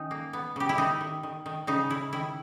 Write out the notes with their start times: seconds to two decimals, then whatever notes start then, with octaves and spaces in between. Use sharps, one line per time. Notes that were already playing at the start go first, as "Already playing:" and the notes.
Already playing: D#3 C#4 D#4
0.11 A#3
0.33 B3
0.56 C#3 G4
0.69 E4
0.78 D#3 D#4
1.01 D#3
1.23 D#3
1.46 D#3
1.67 C#3 D#4
1.90 C#3 E4
2.13 D#3 E4